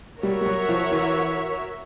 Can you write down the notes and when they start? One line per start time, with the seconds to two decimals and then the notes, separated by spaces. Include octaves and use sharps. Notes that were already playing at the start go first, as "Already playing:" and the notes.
0.23 G3 F#4 A#4 C#5 E5
0.41 G3
0.46 F#3
0.69 F3
0.91 E3